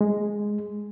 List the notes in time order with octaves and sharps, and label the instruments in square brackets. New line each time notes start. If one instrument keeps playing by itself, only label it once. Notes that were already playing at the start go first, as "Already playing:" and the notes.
[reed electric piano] G#3